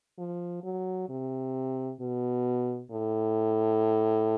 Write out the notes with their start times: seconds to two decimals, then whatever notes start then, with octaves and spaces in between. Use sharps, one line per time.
0.18 F3
0.63 F#3
1.09 C3
2.00 B2
2.91 A2